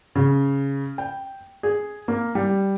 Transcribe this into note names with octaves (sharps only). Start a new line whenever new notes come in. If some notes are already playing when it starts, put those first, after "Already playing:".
C#3
G5
G#4
A#3
G3